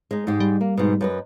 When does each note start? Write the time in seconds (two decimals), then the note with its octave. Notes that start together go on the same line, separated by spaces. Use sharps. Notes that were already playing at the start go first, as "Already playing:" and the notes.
0.11 G#3 D#4
0.27 G#2 G#3 G4
0.40 G3
0.61 A#3
0.77 G#2 B2
1.01 F#2 B4 D#5